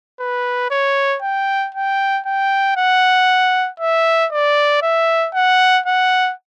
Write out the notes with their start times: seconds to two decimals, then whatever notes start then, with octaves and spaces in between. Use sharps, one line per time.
0.20 B4
0.71 C#5
1.22 G5
1.74 G5
2.26 G5
2.77 F#5
3.80 E5
4.32 D5
4.82 E5
5.34 F#5
5.86 F#5